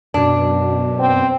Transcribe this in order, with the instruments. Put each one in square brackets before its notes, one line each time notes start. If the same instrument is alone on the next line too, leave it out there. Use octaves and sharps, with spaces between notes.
[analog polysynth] F#2 B2 [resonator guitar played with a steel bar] D4
[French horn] C4